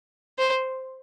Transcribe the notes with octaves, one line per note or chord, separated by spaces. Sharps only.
C5